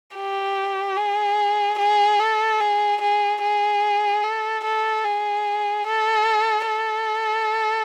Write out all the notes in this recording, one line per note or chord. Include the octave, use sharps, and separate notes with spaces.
G4
G#4
G#4
A4
G#4
G#4
G#4
A4
A4
G#4
A4
A4